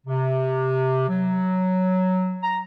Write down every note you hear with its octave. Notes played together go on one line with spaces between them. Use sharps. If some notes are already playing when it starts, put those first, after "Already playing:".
C3
F#3
A#5